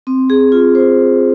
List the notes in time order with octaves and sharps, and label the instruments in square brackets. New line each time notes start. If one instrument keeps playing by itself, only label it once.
[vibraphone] C4
G#4
F4
C5